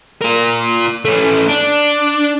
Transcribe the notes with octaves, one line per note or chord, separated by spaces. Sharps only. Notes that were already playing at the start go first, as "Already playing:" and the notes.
F4 A#4
A3 C#4
D4